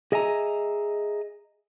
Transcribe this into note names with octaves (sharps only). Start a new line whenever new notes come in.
G#4 D#5 E5 G#5 A#5